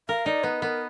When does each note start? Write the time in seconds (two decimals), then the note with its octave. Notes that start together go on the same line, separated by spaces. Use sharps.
0.09 A#4 F5
0.26 D#4 D5
0.44 B3 B4
0.61 B3 A#4